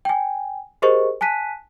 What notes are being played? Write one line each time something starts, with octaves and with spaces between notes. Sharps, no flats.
G5 G#5
G4 G#4 A#4 C5 D#5 C#6
G#5 A5 F#6 B6 D#7